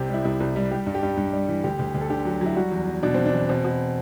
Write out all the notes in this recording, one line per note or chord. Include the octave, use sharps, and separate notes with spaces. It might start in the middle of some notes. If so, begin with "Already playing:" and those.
Already playing: C2 C3 G4
G3 E4
C2 E4
C2
G3
G3 G4
G2
G4
G2
G2
G3
E3
D2 G4
D2
D2
A4
D3 G4
F#3
F#3 E4
G3 F#4
E2
E2
B2 D4
E2 C4
D4
E2
B2 C4
B2